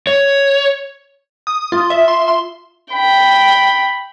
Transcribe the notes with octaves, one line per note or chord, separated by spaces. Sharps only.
C#5
D#6
F4
E5
C6
C6
G5 B5